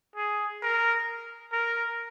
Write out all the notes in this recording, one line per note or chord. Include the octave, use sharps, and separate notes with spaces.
G#4
A#4
A#4